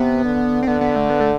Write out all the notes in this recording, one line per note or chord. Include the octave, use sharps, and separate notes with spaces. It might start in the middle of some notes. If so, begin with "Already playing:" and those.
Already playing: C3 B3
D3
C4
D3 B3
B3
A3
B3
A3